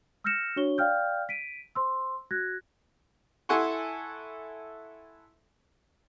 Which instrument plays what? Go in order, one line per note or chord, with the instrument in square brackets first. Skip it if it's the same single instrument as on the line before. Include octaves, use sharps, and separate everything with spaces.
[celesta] E6 F6 G6 A#6 C#7 E7
D4 F#4 C#5 C#6 G7
D5 F5 G5 F6 G6
B6 D7 D#7
C5 C6 E6
F#4 F#6 G#6 A#6
[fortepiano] E4 A4 F#5 G#5 C6 C#6